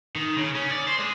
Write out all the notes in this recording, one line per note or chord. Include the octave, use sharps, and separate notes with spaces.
D#3
C#3
C#4
D5
C5
G#3